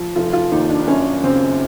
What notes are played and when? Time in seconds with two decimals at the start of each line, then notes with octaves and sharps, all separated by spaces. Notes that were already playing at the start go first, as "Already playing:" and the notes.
Already playing: F3
0.15 F1 F4
0.33 F4
0.51 D#2 D#4
0.70 D4
0.84 D4
0.87 F#2 C#4
1.24 C#3 C4